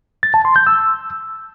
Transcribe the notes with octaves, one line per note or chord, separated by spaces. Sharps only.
A6
A5
C6
G6
E6